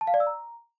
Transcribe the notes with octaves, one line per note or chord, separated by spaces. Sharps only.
A5
F5
D5
E6
A#5